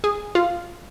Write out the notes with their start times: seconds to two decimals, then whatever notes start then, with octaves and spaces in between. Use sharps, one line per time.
0.04 G#4
0.35 F4